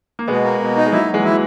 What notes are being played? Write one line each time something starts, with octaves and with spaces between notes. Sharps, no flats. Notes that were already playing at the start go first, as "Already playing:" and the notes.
A#3
B2 G#3 B3
A#3
B2
D#4
G#3
F#3 A#3 E4
F#3
E3 G#3
F#3 E4
E3